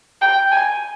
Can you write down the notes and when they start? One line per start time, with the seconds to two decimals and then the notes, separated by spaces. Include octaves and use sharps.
0.21 G5
0.52 G#5